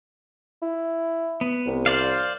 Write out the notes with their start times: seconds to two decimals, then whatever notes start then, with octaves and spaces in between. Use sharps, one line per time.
0.62 E4
1.41 B3
1.66 C2
1.86 C5 D5 F5